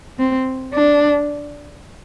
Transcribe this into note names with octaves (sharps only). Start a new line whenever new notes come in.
C4
D4